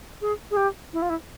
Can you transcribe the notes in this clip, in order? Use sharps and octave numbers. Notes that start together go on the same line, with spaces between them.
G#4
G#4
G4
E4
F4
E4